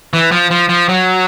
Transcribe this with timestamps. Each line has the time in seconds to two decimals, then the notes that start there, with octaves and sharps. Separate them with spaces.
0.13 E3
0.32 F3
0.51 F3
0.69 F3
0.89 F#3